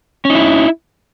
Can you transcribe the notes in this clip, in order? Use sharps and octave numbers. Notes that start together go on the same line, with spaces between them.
C#4 D#4 E4